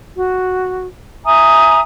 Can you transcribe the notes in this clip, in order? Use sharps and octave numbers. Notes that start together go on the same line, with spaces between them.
F#4
E5 G#5 A#5 D#6